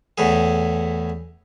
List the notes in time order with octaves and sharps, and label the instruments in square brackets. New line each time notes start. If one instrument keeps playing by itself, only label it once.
[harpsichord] E2 A2 G#4